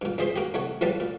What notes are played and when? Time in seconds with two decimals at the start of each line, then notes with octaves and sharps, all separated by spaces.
0.02 G2 A#2
0.18 C#2 E3 G#4 C5 E5 C6
0.36 A#3 F#4 G4
0.54 C2 A3 C#5 F#5
0.81 C#2 A2 E3 G3 B4 A5
1.00 A#2